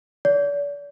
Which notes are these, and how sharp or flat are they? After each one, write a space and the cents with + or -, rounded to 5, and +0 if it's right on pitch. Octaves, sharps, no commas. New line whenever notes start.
D5 -40